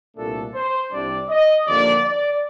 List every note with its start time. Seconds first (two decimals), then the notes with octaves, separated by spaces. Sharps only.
0.16 C2 A#2 A3 D4 A4
0.54 C5
0.91 C2 C3 G3 D4 D5
1.29 D#5
1.66 D#2 D3 F3 A#3 D5
2.04 D5